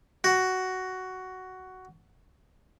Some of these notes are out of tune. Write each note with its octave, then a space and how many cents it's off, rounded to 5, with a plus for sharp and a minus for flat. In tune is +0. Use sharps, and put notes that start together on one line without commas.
F#4 +10